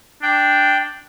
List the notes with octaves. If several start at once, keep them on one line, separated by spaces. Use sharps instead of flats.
D4 G5